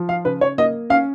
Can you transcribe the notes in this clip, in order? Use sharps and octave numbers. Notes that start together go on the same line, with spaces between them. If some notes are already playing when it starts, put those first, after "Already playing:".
Already playing: F3
F5
C#3 B4
C#5
A#3 D#5
C#4 F5